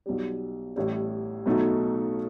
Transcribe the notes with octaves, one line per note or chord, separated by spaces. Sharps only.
B1 B2 G3
A1 A2 G3
B1 B2 A3 D#4 F#4